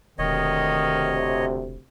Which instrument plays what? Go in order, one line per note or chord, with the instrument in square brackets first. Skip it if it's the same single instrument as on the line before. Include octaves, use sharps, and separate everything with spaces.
[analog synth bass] E1 [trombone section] D2 C3 [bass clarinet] D#3 [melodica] C#5 D#5